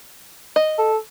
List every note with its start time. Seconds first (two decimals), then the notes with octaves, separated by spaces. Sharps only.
0.56 D#5
0.78 A4